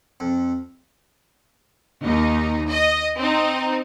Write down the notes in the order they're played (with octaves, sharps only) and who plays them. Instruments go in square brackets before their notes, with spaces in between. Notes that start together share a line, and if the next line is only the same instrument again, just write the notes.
[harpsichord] F2
[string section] D#2 D#4
D#5
C4 D#4